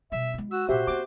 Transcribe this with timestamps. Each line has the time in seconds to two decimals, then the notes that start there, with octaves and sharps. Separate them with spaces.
0.12 B2 G3 E5
0.34 G#3 E4
0.51 F#4 E6
0.69 A#2 C#4 F#4 G4 C5 E5
0.87 A#3 C4 D6